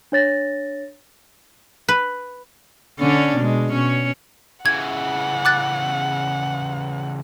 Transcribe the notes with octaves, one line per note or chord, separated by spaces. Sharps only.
D4 C#5 A6 A#6
B4
D3 C#4 D4
B2 G#3
B2 C#4 C#5
C#3 E3 F#5 G#6
D6 F#6 A6